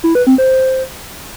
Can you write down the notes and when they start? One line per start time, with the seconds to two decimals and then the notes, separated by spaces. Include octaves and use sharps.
0.04 E4
0.15 B4
0.27 C4
0.38 C5